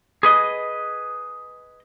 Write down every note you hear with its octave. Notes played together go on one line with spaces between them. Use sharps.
G#4 B4 D#5